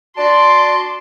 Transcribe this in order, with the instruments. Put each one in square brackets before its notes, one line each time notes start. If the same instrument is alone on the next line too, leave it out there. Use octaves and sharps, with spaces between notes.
[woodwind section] D4 F#4 D5 [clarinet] A5 [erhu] C6